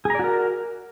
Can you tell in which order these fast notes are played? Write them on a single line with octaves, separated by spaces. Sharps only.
G#4 A#5 D5 F#4 A#4